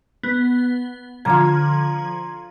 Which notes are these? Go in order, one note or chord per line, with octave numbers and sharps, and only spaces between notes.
B3
D3 F3 F4 A#5 G#6